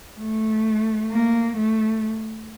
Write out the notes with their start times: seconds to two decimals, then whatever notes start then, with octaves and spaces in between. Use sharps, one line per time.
0.20 A3
1.11 A#3
1.57 A3